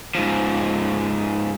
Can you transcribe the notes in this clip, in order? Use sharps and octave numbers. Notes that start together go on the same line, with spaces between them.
G#2 F3